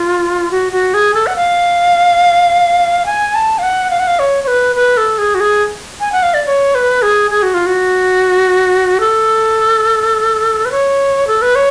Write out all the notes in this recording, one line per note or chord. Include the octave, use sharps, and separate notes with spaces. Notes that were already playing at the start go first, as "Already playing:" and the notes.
Already playing: F4
F#4
F#4
G#4
A4
F#5
F5
G#5
A5
F5
F#5
F5
F#5
F5
C#5
C#5
B4
B4
A4
G#4
F#4
G#4
G#5
F#5
F5
D5
C#5
B4
G#4
G#4
F#4
F4
F#4
A4
B4
C#5
A4
B4
C#5